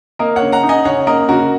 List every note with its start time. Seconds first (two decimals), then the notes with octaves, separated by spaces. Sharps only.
0.19 A#3 A#4 D#5
0.36 C#5 F#5
0.42 C#3
0.52 F#5 A#5
0.63 D#4
0.69 D#5 G#5
0.85 C#3 C#5 F#5
1.07 A#3 A#4 D#5
1.29 C#3 F#4 A#4